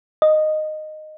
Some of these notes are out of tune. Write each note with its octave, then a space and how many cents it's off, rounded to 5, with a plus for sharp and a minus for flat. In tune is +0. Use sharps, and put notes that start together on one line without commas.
D#5 -10